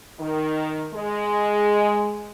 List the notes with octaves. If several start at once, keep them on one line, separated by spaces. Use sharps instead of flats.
D#3
G#3